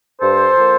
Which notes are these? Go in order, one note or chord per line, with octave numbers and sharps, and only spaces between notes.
G2 A4 C5
F3 A#3